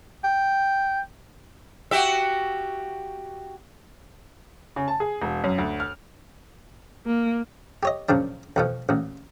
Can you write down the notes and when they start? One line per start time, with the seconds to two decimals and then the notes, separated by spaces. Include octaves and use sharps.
0.24 G5
1.91 F#4 G4 E5
4.76 C#3
4.88 A5
5.00 G#4
5.22 E1
5.44 F#2
5.58 D2
5.80 F6
7.06 A#3
7.83 G4 C#5 D#5
8.09 F#2 A#2 C#3 F3 D4
8.56 F2 B2 F3
8.89 A1 A#2